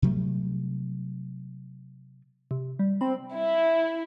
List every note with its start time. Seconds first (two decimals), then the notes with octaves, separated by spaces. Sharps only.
0.02 C3 F#3 G3 A3
2.51 C3
2.79 G3
3.01 C4 B5
3.35 E4